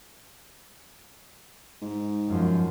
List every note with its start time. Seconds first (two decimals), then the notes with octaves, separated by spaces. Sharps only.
1.82 G#2
2.29 F#2 F3